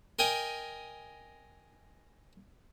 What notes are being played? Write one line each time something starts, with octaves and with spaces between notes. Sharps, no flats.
A#4 D#5 G5 G#5